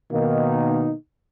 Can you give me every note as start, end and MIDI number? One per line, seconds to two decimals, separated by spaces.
0.12 0.92 47
0.12 0.92 51
0.12 0.92 58
0.12 0.92 63